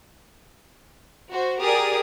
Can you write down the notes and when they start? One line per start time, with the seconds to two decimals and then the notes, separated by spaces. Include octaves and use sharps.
1.29 F#4 C5
1.61 G4 G#4 A#4 D5 D#6